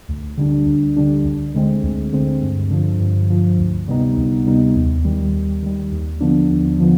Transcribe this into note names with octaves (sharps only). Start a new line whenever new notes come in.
D2
D3 G3 D4
D2
D3 G3 D4
D2
D3 G#3 C4
D2
D3 G#3 C4
G2
D3 F3
G2
D3 F3
D2
C3 G3 B3 D#4
D2
C3 G3 B3 D#4
D#2
D#3 G3
D#2
D#3 G3
D#2
D3 F3 B3 D4
D#2
D3 F3 B3